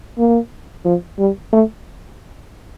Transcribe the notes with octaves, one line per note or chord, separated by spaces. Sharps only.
A#3
F3
G3
A3